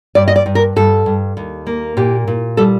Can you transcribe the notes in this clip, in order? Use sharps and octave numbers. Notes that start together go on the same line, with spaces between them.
G2 D5
D#5
D5
G2
A#4
G2 A4
G2
D#2
A#3
A#2 G4
A#2
G3 A4